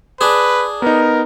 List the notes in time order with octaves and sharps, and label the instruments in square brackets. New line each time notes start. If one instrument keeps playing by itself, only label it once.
[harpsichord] D4 G#4 [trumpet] B4
[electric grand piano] B3 D#4 [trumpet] A#4